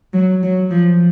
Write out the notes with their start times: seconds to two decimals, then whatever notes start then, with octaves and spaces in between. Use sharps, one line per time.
0.14 F#3
0.43 F#3
0.71 F3